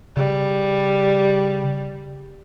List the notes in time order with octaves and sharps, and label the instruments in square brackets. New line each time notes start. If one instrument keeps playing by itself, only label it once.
[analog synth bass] C#3 [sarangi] G3